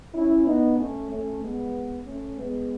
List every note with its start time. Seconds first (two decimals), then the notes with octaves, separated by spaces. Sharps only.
0.14 C#4 E4
0.46 B3 D#4
0.78 A3 C#4
1.10 A3 C#4
1.42 G#3 B3
2.06 A3 C#4
2.38 G#3 B3